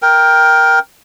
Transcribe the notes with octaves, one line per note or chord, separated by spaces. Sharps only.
A#4 G5